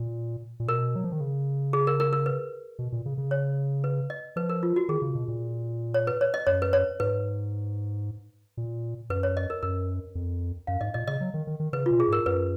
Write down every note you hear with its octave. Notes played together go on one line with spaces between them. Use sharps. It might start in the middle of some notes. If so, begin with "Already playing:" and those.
Already playing: A#2
A#2
B2 A#4
F#3
F3
D#3
C#3
G#4
A#4
A#4
A#4
B4
B2
A#2
C#3
C#3
C#5
B4
D#5
F3 B4
A#4
F4
F#4
D#3 G#4
C#3
B2
A#2
C#5
B4
C#5
D#5
F#2 C#5
B4
C#5
G#2 B4
A#2
F#2 B4
C#5
D#5
A#4
F#2 A#4
F2
F#2 F5
G#2 D#5
A#2 D#5
C#3 D#5
F#3
D#3
D#3
D#3
C#3 B4
B2 F4
G#4
G#2 A#4
F#2 B4